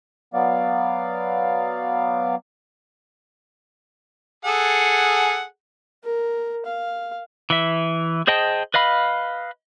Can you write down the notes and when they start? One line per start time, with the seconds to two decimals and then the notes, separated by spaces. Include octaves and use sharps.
0.34 F#3 B3 D5 F5
4.45 G#4 A4 F#5
6.04 A#4
6.66 F5
7.50 E3 E5
8.27 G#4 C5 D#5 G5 A5
8.74 B4 D#5 F5 B5